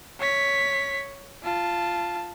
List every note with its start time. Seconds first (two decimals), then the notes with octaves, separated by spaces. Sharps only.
0.20 C#5 B6
1.43 F4 A5